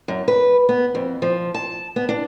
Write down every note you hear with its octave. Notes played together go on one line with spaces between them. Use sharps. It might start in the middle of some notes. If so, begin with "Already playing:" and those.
F#2
B4
B3
F2
F3
A5
B3
D4